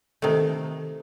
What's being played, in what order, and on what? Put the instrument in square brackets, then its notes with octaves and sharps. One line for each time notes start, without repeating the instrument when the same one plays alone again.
[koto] C3 D#3 A3